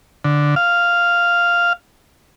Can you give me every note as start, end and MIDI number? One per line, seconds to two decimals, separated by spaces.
0.25 0.55 50
0.56 1.73 77